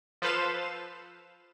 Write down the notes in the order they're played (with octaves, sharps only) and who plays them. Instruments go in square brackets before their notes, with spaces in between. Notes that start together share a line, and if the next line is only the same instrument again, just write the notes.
[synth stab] F3 A4 B4 C5 F5 E7